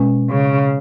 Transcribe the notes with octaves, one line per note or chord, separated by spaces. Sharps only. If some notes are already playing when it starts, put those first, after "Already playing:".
Already playing: B2 G#3 C#4
C#3